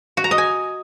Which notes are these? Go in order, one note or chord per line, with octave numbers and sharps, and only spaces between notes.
F#4
A#5
D#5
G#5